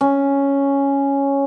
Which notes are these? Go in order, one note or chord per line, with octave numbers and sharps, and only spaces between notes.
C#4